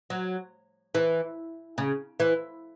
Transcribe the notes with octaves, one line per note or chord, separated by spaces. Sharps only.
F#3
E3
C#3
E3